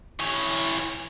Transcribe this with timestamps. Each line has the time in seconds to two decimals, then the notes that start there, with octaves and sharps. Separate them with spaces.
0.20 E3 C#5